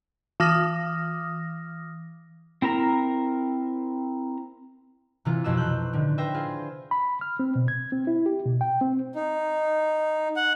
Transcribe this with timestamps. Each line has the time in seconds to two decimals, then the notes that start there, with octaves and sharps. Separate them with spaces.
0.40 E3 D6 D#6 F6 A#6
2.62 C4 E4 A#4 A#5
5.25 C3 E3 F4
5.44 B1 F2 B2 F#4 C5 E6
5.57 F#6 G6
5.93 A2 D3 D#3
6.18 B4 C5 E5 G5 A#6
6.34 F4 G#4
6.91 B5
7.21 F6
7.39 C4
7.56 B2
7.68 G#6
7.92 C4
8.07 E4
8.26 G4
8.46 B2
8.61 G5
8.81 C4
9.15 D#4
10.36 F#5